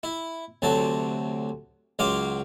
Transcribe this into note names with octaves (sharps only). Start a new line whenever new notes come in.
E4
D2 C3 F#3 A5
C#2 F#3 F5 C6 D6